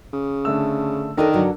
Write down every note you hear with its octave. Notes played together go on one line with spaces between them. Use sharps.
C#3
D3 A3 E6
D#3 D4 A4 A#4 D#5
G2 D3 F#3